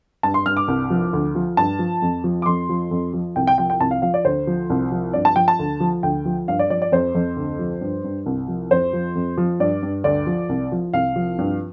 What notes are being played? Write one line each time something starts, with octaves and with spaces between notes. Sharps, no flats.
G2 A5
C6
G2 F6
D6
C2
F3
D2
F3
G2 A5
F3
F2
F3
D6
F2 C6
F3
F2
F3
C2 G5
G5
F3 G5
G5
C2 A5
F5
F3 F5
D5
D2 C5
F3
C2
F3
G2 D5
A5
F3 G5
A5
D2
F3
D2 G5
F3
G2 F5
D5
F3 D5
D5
F2 C5
F2
D2
F3
G2
G2
C2
F3
F2 C5
F3
F2
F3
G2 D5
G2
D2 D5
F3
C2
F3
C2 F5
F3
G2